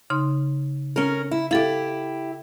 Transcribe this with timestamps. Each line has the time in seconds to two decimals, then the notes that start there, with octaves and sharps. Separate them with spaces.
0.10 C#3 D#4 C6
0.96 C#4 A#4
1.31 E4
1.51 E4 G4 A4 F5